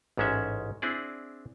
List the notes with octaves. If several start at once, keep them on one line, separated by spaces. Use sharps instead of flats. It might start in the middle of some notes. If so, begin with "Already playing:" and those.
A1 G#2 G#3 C#4 E5
C4 D4 E4 G#4 D5